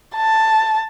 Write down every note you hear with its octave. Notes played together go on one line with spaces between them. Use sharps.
A5